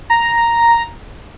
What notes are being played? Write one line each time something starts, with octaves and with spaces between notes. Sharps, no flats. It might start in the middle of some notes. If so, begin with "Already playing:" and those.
A#5